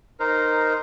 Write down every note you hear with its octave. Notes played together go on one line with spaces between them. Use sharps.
D#4 A#4 C5